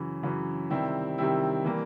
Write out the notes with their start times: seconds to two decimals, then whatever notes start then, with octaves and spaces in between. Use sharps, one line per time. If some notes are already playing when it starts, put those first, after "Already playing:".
Already playing: F#2 C#3 E3
0.23 F#2 C#3 E3
0.70 C3 D#3 G3 C4 E4
1.18 C3 D#3 G3 C4 E4
1.65 E3 G3 A#3